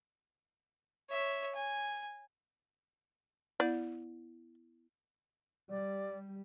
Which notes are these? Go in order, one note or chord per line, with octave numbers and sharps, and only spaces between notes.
C#5 E5
G#5
B3 E4 D5
G3 D5